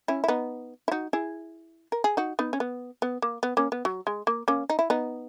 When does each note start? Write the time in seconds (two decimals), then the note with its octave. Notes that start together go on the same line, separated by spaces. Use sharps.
0.08 C#4 E4
0.24 E4
0.28 B3 D#4
0.88 E4
0.92 D#4 F#4
1.13 E4 G#4
1.92 A#4
2.04 G#4
2.17 D#4 F#4
2.39 B3 D#4
2.53 C#4
2.60 B3
3.02 B3
3.22 A#3
3.43 B3
3.57 A#3 C#4
3.72 B3
3.85 F#3
4.07 G#3
4.27 A#3
4.48 A#3 C#4
4.70 D#4
4.79 E4
4.90 B3 D#4